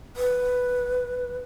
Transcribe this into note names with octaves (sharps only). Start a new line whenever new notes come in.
B4